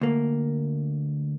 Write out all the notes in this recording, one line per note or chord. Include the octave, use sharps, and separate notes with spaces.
D2 A#3